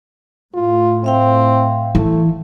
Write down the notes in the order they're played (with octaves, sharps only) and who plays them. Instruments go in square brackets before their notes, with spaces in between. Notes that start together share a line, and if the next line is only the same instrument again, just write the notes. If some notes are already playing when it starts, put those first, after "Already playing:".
[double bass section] A2 [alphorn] F4
[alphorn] C4 [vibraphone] E5 F5 G5
[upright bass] E3 [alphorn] A3